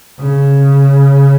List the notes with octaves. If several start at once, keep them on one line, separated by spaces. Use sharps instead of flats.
C#3